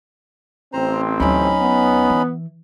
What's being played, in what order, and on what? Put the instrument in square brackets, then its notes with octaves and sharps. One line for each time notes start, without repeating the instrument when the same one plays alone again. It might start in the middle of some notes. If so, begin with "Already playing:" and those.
[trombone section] A1 C4 [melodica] C5 A#5
[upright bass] D2 F#3 [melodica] C#4 D#4 B5
[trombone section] B3
[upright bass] E3